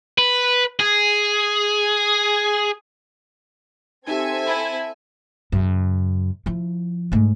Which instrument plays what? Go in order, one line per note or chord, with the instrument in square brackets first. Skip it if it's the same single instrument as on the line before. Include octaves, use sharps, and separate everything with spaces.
[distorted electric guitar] B4
G#4
[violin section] C4 A4 G#6 [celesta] D#4 G4 [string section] E5 G#5
[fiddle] E4 [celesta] B5
[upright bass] F#2 C#3
F3 E4
G#2 A3